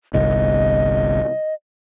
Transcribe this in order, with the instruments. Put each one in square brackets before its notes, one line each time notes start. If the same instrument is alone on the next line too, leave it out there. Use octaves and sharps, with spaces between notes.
[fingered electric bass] G1 C2 [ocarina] D#5